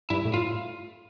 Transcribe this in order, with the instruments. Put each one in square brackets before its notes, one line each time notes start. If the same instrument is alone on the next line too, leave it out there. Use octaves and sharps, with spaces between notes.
[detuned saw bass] G2 [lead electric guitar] E4
[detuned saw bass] A2
[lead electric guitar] F4